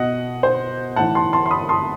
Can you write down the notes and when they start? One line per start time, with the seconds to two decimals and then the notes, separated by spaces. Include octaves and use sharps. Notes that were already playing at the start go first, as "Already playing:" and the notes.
Already playing: B2 D#5 F#5
0.43 C5
0.96 A2 E3 F#5 A5
1.15 A5 C6
1.33 A5 C6
1.46 C6
1.51 B5 D#6
1.69 A5 C6